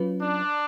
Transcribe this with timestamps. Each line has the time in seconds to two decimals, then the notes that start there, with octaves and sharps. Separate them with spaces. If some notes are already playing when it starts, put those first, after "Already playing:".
Already playing: F#3 C#4 F4 B4
0.23 D4